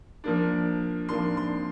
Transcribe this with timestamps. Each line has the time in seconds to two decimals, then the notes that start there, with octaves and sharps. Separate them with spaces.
0.24 F3 A#3 D4
1.09 F3 A#3 D4 C6
1.37 C6